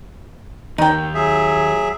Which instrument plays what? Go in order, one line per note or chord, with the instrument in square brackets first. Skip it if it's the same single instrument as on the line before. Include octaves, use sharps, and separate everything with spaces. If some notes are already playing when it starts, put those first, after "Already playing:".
[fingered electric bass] D#2 [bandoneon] D#3 [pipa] D#4 G5
[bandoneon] F#3 G#4 E5